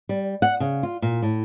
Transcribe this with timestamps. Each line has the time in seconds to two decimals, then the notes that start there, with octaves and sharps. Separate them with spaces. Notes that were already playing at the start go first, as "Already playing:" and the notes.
0.09 G3
0.42 F#5
0.60 C#3
0.83 F4
1.02 A#2
1.23 A2